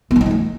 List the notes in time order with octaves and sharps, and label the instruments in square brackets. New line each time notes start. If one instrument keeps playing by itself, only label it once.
[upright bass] B3
E3
D#4
F3
A3